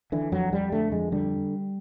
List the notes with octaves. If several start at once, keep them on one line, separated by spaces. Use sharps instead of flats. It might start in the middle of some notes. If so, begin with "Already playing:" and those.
D3 E3
F2 F#3
F2 G3
D3 A3
F2 G#3
D3 G3